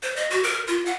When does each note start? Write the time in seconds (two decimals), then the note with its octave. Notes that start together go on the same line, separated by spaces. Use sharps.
0.03 C5
0.16 D#5
0.30 F#4
0.43 A#4
0.67 F4
0.85 F#5